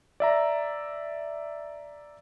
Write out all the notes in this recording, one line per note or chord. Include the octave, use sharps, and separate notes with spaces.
D5 E5 A#5